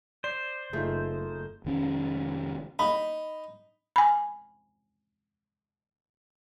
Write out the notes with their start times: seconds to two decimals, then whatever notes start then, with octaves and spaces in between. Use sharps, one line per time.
0.24 C5 D5 C7
0.73 F#1 A3 D#4 F4 G#4
1.65 F1 D#3 C#4
2.79 D#4 B5
3.96 G#5 B5